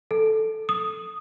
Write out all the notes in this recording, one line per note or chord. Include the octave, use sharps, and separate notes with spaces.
A4
D#6